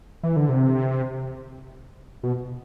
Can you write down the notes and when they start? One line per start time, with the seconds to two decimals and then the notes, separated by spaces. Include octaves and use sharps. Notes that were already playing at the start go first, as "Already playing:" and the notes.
0.23 E3
0.36 D3
0.49 C3
2.24 B2